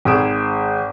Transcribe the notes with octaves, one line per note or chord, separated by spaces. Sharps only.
G#1 G#3 G#4 D#6 D7 E7